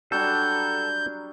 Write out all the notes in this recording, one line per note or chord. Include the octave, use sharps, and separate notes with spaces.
F#3 G3 D4 A4 G6